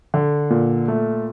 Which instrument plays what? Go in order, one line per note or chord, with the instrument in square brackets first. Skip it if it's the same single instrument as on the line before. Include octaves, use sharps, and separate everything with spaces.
[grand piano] D3
A#2
A3